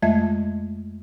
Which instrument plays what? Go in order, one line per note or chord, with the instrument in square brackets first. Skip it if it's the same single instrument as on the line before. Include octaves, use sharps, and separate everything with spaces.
[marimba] F2 G#3 A3 D#5 E5 G#6